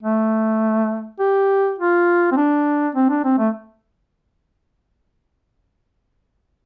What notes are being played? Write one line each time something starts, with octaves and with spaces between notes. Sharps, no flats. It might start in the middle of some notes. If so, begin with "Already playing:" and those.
A3
G4
F4
C4
D4
C4
D4
C4
A3